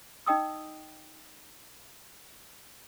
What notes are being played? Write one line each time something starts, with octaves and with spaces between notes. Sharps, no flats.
D#4 D#5 G5 D#6 E6